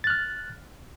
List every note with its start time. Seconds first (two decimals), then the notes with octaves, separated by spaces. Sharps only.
0.04 A6
0.07 F#6
0.10 F6